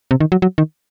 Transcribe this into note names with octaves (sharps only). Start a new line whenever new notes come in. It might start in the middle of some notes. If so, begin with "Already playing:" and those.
C3
D#3
F#3
F#3
D#3